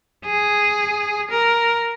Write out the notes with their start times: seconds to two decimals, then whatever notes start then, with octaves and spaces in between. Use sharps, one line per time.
0.25 G#4
1.30 A#4